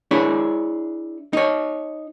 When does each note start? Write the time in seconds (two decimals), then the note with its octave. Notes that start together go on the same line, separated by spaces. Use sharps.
0.11 D4 E4 G#4 C#5
1.33 D#4 C#5